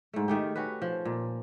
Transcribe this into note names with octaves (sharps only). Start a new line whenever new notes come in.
G#2 A3
D#3 A3 G4
C#4 F#4 G4 B4
F3
A#2